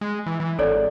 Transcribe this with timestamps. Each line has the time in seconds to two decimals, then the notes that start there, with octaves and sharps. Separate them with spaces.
0.01 G#3
0.26 E3
0.40 E3
0.59 G#1 A4 C#5 D5